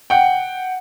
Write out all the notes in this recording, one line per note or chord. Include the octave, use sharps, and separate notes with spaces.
F#5 G5